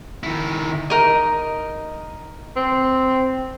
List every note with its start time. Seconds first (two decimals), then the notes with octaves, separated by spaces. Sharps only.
0.23 D#3 E4
0.90 D#4 A#4 D#5
2.56 C4